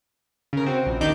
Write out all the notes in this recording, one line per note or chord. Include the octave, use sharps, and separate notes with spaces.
C#3 A#4
C4 F#4
A#1
D#2 D4 D#4 D6 G6